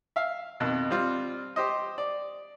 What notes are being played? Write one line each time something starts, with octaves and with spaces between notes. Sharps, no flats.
E5 F5
F2 B2 D#3
G3 C4 F4
G4 C5 D#5
D5